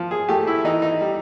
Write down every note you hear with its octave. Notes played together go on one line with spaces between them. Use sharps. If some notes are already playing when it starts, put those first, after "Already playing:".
Already playing: F3
G#4
A3 G4
E4
E3 D#4
D#4
G3